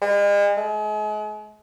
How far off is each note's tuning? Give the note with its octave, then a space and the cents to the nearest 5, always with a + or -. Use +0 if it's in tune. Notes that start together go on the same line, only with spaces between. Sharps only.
G#3 -40
G#3 +40